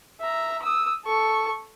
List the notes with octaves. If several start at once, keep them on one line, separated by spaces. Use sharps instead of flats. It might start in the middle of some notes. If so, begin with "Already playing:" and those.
E5 A#5
D#6 E6
A4 C#6